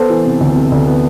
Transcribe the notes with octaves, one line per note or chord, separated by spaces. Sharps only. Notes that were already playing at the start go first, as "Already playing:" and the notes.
Already playing: B3 A4 C5
E3
C3
D2
C3
D2
B3